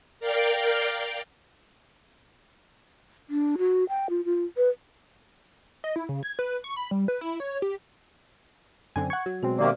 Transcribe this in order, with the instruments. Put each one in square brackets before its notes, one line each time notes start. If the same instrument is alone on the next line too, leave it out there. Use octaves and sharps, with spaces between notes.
[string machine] A#4 D5 F5 G5
[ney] D4
F#4
G5
F4
F4
B4
[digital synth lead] D#5
E4
C#3
G#6
B4
C#6
B5
G3
B4
E4
C#5
G4
[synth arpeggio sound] F#2 D3 C4 [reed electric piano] G#5
[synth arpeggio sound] F#5 C#6 [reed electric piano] G#6
[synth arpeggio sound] F#3
[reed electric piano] B2 G#3 C4 [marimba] F#4
[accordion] C3 D#3 A#3 [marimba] C5 D5